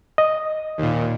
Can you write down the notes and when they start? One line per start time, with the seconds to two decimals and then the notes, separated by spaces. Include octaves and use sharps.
0.18 D#5
0.78 D#2 A#2